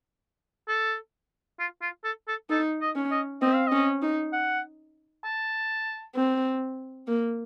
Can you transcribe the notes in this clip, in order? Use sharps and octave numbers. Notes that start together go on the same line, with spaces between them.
A4
F4
F4
A4
A4
D#4 A4
D#5
C#4
D#5
C4 D#5
F5
C#4 D#5
D#4
F#5
A5
C4
A#3